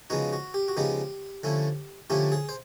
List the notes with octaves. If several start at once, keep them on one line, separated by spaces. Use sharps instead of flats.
C#3 F3 G#3 B3 D#4 F#4
F#4
G4
F#4
C#3 F3 G#3 B3 D#4 G4
D3 F3 A3 C#4 E4
D3 F3 A3 C#4 E4 G4
G#4
C5